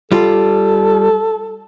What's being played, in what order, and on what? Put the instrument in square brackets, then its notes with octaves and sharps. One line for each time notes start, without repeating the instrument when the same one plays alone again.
[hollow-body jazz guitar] G3 F4 [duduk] A4